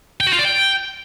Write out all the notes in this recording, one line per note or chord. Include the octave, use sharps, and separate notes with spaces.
G5
F#4
F4
D5
G5